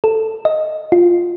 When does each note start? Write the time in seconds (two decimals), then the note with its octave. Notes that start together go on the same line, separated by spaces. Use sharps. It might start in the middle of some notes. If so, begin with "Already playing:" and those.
0.04 A4
0.45 D#5
0.92 F4